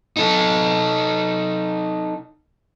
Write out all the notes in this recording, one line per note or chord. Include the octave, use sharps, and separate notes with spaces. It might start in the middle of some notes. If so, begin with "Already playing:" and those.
D#4 A4